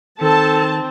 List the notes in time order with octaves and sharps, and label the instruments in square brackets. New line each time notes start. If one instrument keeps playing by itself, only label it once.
[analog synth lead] D#3 [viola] C4 [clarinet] A4 [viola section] A5